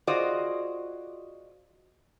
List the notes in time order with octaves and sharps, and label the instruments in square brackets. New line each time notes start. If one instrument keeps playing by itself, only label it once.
[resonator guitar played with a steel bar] F4 F#4 G#4 C5 D5 D#5